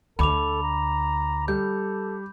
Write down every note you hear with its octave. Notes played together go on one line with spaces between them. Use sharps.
D2 A4 B5 D6 F7
A#5
G3 A4 G6